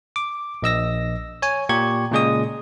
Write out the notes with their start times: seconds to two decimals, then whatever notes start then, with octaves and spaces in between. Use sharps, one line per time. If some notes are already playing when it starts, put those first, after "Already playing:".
0.16 D6
0.62 A#1 D#5 E6 A#6
1.42 C#5 G#5
1.69 A#2 G4 C#6 G#6
2.12 A#2 C#3 G#3 G#4 D#5 D#6